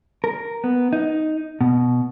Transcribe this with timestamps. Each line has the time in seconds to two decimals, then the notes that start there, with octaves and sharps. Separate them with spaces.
0.24 A#4
0.64 B3
0.93 D#4
1.61 B2